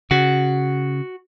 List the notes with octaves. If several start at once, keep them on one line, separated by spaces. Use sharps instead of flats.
C#3 F#4